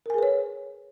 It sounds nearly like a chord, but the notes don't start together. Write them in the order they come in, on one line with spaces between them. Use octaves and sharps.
A#4 G#5 G#4 B4 C#5